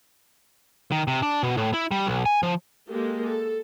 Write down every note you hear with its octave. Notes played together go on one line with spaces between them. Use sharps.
D#3
C3
D4
B2
A2
E4
G3
B1
G#5
F3
G#3 A#3 G4 A4
A4